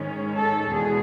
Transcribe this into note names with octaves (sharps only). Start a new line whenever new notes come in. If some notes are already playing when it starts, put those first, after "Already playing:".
Already playing: G#2 D#3 G#3 C#4
A4
E2 B2 G#3 G#4